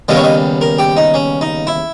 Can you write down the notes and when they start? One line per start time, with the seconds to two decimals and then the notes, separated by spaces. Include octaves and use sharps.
0.09 D#2 C#3 G3 B3 D#5
0.16 C#5
0.24 D#5
0.61 A#4
0.79 G4
0.97 D#4
1.14 C#4
1.41 D#4
1.67 E4